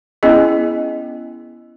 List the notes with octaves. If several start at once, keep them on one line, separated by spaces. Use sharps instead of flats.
B3 C#4 E4 G#4 D#5